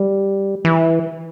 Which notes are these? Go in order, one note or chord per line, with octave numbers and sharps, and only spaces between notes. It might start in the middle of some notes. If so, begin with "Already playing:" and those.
Already playing: G3
E3